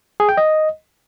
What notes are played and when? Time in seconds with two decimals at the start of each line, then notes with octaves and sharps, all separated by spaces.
0.20 G#4
0.29 G5
0.37 D#5